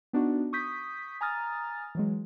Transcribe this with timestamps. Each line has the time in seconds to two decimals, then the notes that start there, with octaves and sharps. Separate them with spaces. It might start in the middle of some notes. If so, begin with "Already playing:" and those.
0.13 B3 D4 D#4 F#4
0.53 C#6 D#6 G6 B6
1.21 G#5 A#5 D#6 F6 A6
1.95 E3 F#3 G#3